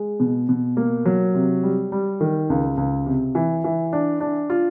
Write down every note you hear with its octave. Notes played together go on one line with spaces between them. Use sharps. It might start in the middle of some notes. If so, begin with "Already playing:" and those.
Already playing: G#3
B2
B2
A#3
F#3
C3
G3
G3
D#3
C#2
C#2
C3
E3
E3
D4
D4
F4